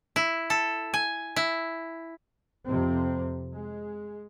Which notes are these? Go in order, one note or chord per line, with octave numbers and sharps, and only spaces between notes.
E4
A4
G#5
E4
F2 C3 C4
G#3